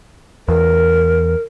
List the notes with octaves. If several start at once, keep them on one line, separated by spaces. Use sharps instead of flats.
E2 A#4